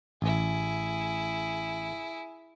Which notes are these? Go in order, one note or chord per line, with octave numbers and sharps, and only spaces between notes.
A1 E4 G#4